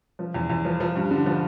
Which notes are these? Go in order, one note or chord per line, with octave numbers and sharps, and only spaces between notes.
F3
E2
E2
F3
F3
G2
D3
F3